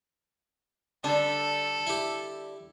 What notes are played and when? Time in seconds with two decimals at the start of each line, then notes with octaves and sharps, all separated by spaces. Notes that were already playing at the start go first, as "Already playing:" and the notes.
1.04 D3 G3 D4 A4
1.87 E4 G4